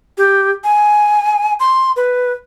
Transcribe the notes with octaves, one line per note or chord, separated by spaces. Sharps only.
G4
G#5
C6
B4